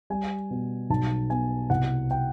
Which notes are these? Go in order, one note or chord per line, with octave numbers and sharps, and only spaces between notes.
G3 G#5
B2
B1 A5
B2 G#5
C2 F#5
G5